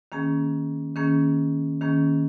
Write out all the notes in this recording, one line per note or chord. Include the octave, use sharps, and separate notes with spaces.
D#3 A#3 C#4 G#4
D#3 A#3 C#4 G#4
D#3 A#3 C#4 G#4